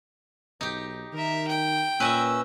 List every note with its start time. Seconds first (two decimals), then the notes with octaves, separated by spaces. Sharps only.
0.61 B1 D#4 G4
1.13 D#3 A#4 E5
1.48 G5
2.00 A#2 C#4 B4 D#5 E5 E6